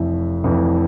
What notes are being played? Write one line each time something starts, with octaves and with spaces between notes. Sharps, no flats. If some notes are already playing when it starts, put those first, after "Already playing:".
Already playing: F1 F2 E3 E5
F1 F2 E3